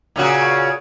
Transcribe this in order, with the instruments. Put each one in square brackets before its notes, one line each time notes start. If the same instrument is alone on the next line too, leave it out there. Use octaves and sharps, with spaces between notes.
[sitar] A#2 C#3 F#4